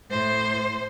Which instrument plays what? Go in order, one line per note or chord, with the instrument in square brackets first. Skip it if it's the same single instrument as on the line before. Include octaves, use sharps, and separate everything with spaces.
[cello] A2 C5